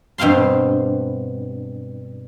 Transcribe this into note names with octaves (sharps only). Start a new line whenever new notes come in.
G2 B2 C4 F5 C6